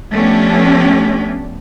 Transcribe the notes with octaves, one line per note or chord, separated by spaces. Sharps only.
F3 A3 B3 C#4 D4 G4